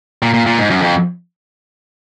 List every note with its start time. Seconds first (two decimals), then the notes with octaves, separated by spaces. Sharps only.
0.22 A#2
0.34 A#2
0.46 A#2
0.59 G#2
0.70 F#2
0.82 F2